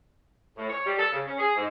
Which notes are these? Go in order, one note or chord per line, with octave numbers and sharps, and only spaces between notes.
A2
C#5
G3
A4
C#3
C#4
G#4
G#2